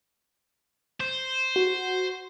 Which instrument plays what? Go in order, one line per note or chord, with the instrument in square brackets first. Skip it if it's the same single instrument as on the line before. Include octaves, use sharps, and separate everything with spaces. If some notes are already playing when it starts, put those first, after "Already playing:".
[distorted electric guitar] C5
[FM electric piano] F#4